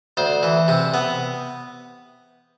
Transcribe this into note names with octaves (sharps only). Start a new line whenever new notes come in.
D2 C5
E3
C3
B3